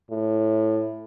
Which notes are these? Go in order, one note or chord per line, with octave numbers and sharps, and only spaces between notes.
A2